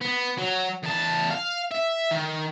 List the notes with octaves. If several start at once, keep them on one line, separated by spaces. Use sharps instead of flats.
B3
F#3
E2 A5
F5
E5
D#3